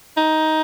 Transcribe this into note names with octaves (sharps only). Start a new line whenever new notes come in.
D#4